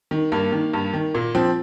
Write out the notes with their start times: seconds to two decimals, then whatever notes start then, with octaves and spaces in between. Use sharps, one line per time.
0.11 D#3
0.32 G2 A#3
0.52 D#3
0.73 G2
0.94 D#3
1.14 A#2 A#3
1.35 F3 C4